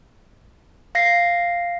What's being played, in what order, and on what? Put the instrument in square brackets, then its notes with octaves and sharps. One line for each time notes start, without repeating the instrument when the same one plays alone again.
[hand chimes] F5 A#6 C7